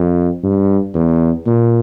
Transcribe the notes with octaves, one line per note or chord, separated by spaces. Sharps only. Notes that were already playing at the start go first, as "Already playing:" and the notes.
Already playing: F2
G2
E2
A#2